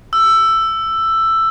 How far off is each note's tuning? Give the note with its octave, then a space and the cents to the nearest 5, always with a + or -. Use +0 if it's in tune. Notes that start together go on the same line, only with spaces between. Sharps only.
E6 +10